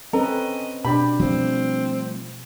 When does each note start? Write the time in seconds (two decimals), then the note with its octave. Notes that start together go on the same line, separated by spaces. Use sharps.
0.13 C4 C#4 A4 B4 D#5 A#5
0.85 B2 D4 G4 B5
1.19 F3 G3 A3 C4